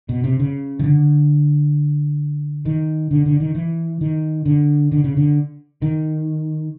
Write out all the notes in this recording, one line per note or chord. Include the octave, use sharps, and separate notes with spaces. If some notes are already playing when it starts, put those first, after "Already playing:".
B2
C3
C#3
D#3
D3
D#3
D3
D3
D#3
E3
D#3
D3
D3
C#3
D3
D#3